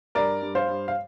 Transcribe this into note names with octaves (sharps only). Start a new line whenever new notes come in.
G2 A#4 D5
G2
C5 F5
G2
F5